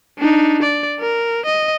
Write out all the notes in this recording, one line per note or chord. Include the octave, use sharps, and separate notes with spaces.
D4 D#4
D5
A#4
D#5